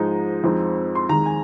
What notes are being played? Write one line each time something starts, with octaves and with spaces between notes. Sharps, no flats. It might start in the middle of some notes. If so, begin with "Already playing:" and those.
Already playing: G#2 F3 G#3 D#4
F2 F3 G#3 C4 D#4
C6
D#2 D#3 G#3 A#5
G#5